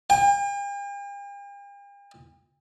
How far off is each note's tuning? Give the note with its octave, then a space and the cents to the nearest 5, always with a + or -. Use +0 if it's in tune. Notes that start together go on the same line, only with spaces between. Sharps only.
G5 +45